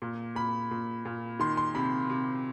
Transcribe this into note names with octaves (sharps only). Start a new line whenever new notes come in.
A#2
A#2 B5
A#2
A#2
D#3 C6
C6
C3 B5
C3